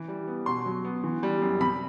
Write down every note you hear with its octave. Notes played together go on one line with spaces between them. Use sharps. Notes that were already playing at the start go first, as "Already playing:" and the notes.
Already playing: E3
G3
B3
B2 C6
F#3
B3
E3
G3
F#2
C3 B5